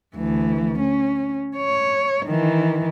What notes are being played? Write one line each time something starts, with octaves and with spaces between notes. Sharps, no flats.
D2 E3
C#4
C#5
D#3 E3